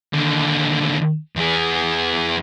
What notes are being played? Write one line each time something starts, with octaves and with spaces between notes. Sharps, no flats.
D#2 D3
E2 G#4